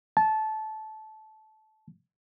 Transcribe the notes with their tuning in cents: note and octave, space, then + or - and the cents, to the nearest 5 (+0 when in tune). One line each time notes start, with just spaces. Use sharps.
A5 -20